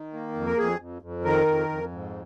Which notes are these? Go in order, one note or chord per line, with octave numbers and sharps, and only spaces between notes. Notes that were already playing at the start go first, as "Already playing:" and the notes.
Already playing: D#3
A#3
F2
A#4
F2 G#4
F2
F2
D#3 A#4
F2
F2
G#2